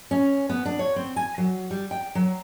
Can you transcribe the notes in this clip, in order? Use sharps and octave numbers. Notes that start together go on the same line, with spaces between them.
C#4
B3
D4
C#5
C4
G#5
F#3
G3
G5
F#3